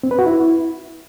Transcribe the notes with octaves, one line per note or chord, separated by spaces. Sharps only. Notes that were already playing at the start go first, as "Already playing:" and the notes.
C4
B4
F#4
E4